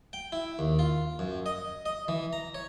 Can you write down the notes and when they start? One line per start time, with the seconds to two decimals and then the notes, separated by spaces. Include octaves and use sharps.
0.13 G5
0.32 E4
0.59 D#2
0.79 F4
1.19 F#2
1.46 D#5
1.86 D#5
2.08 E3
2.33 A#5
2.54 C#5